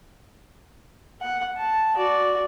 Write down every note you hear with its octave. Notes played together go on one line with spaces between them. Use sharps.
F#5
A5
F#4 D5